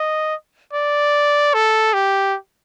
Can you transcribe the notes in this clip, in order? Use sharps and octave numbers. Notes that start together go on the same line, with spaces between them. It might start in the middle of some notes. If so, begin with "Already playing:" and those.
Already playing: D#5
D5
A4
G4